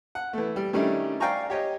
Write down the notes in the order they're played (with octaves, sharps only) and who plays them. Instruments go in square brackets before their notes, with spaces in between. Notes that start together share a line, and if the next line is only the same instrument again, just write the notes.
[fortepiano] F#5
E3 A3
G3
D#3 G3 A3 C#4 D4 E4
D5 F5 G5 G#5 A#5 C#6
G4 C#5 D#5